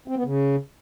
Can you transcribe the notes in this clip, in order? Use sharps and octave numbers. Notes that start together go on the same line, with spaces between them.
C4
B3
C#3